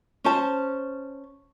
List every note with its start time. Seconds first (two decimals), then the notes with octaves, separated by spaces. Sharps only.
0.24 C#4 C5 A5